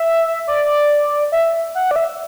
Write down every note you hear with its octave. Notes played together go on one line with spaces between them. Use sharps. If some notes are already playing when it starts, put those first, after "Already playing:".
Already playing: E5
D5
E5
F#5
D5
E5